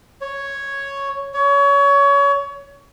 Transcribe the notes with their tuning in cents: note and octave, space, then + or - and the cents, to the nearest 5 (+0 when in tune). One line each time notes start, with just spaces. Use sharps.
C#5 +0
C#5 +25